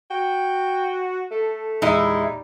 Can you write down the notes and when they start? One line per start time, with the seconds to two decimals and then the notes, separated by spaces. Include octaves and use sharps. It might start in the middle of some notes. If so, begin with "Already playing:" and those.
0.11 F#4 G5
1.31 A3 A4
1.82 E2 A#2 G3 G#3 D#4 E4